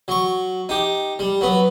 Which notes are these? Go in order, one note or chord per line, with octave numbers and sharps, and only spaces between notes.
F#3 C#6
D#4 G4
G3
F#3 B3